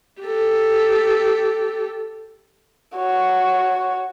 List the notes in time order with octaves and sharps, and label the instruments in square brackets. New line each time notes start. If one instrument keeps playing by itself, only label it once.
[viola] G4 A4
[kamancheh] F#4 C#5